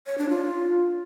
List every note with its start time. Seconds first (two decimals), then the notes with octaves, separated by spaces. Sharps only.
0.06 C#5
0.18 D4
0.29 F4